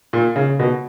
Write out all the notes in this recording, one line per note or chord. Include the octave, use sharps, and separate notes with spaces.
A#2
C#3
B2